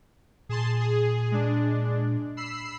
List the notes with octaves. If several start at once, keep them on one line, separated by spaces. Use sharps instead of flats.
A#2 G#4 A5 C6
G#4
G#3 D4
B5 E6 C7